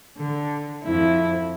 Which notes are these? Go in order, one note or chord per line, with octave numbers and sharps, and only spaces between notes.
D3
F2 E4